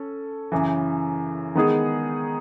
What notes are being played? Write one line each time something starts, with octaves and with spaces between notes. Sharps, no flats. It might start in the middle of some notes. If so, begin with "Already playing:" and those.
Already playing: C#4 A4
F#2 C#3 E3
D#3 G#3 B3 D#4 G#4